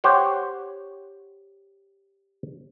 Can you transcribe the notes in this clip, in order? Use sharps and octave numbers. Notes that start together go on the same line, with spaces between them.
G4 C5 C#5 F#5